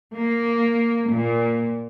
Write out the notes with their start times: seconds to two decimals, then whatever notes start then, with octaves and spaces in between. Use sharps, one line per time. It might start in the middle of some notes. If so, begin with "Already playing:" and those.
0.13 A#3
1.12 A#2